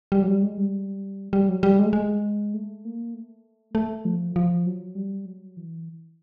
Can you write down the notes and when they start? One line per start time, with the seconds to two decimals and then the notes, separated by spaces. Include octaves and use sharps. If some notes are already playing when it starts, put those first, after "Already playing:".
0.12 G3
0.22 F#3
0.28 G3
0.42 G#3
0.58 G3
1.33 G3
1.49 F#3
1.63 G3
1.79 G#3
1.86 A3
1.93 G#3
2.54 A3
2.85 A#3
3.14 A3
3.75 A3
4.05 F3
4.36 F3
4.66 F#3
4.95 G3
5.26 F#3
5.57 E3